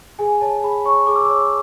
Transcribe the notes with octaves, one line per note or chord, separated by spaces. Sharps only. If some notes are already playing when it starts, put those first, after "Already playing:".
G#4 G#5
C#5 A5
G#4 B5
C#5 C#6
G#4 D6
E6
C#5 D6